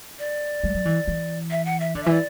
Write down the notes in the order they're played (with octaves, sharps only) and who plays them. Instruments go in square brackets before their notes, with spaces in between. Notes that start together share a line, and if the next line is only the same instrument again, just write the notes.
[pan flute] D5
[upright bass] G3
F#3
E3
E3
[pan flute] E5
F#5
E5
[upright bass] D3 [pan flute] D5
[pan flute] E5
[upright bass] E3 [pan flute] D5